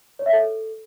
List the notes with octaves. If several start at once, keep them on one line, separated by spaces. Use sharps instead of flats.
C#5
E5
A4